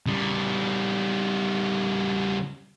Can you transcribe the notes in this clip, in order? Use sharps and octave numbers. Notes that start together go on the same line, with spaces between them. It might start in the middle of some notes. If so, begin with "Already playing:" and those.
C#3 G3